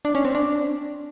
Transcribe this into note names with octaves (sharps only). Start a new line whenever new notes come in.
D4
C#4
C4
D4